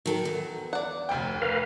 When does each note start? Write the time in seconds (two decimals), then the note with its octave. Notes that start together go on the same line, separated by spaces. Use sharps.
0.06 D#3 F#3 A4
0.25 E2
0.73 D5 F#5
1.09 F1 D2 G5
1.42 A#4 B4 F5